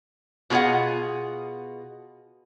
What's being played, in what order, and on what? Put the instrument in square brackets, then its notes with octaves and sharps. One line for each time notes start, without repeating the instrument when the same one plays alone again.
[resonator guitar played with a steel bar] B2 F4 G#4 D#5 F#5